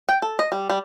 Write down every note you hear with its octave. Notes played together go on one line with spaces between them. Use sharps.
G5
A4
D#5
G3
G3